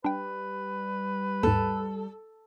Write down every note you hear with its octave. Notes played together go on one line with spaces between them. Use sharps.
G3 D4 B4 G5
D#2 G#2 A4